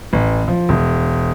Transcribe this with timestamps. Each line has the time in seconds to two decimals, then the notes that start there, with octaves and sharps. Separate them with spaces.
0.13 A1
0.48 F3
0.69 E1